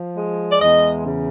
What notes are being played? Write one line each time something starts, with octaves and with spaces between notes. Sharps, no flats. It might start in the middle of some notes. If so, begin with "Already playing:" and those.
Already playing: F3
G#3
D5
E2 D#5
C#3